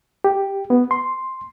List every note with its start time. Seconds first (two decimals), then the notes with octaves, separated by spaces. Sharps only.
0.24 G4
0.70 B3
0.91 C6